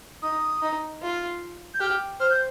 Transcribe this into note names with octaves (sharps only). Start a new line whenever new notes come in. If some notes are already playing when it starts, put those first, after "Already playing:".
D#4 D#6
D#4
F4
G6
G4 F6
C5 F6
G6